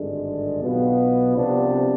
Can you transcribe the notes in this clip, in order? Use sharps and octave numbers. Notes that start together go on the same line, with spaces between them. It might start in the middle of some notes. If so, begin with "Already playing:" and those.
Already playing: G#1 G2 D3 G#3 D4
B1 B2 B3 F4
C2 C3 F3 B3 D4